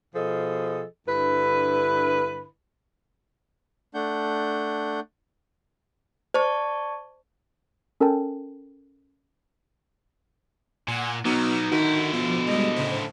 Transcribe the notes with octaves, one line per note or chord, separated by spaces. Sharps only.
B2 F3 G#4 A4 D#5
G2 D3 E4 B4
A3 D4 F#5 G6
C5 D5 A5 C#6
C#4 A4 A#4 G5 A5
A#2 F#5 G#5
B2 F#3 B3 D#4 D6 E6 F6
D3 D#3 E4 F#4
B2 F3
G3 G#3 D#5
A2 C#3 C5